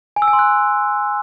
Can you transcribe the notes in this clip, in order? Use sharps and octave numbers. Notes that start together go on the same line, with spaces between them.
G#5
E6
G#5
C6
F#6